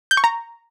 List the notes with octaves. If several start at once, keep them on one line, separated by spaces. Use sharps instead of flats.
G6
C#6
A#5